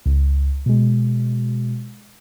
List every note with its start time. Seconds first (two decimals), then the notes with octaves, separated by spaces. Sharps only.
0.06 C#2
0.66 B2 G#3